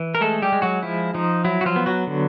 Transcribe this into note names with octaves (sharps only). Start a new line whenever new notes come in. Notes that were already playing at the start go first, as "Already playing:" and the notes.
Already playing: E3
A#4
G#3 A3 A4
G3 G4
G#3
F#3 F#4
F3 E4
F3 D#4
F#3 E4
F#4
F3 F4
B3
F#3 F#4
D3